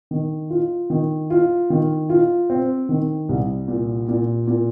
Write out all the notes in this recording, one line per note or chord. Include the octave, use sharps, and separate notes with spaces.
D#3
F4
D#3
F4
D#3
F4
C4
D#3
C2
A#2
A#2
A#2